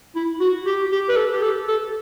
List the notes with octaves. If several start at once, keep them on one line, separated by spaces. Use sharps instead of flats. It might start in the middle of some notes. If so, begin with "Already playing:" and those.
E4
F#4
G4
G4
B4
A4
G4
A4
A4